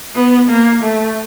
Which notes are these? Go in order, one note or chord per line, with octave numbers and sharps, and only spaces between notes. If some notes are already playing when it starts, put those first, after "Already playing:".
B3
A#3
A3